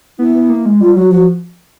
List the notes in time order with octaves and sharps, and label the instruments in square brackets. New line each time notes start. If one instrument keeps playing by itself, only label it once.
[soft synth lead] B3 [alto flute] E4
[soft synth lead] B3
A#3
G#3
[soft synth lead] G3 [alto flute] F4
[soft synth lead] F#3 [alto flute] F#4
[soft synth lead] F3 [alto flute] F#4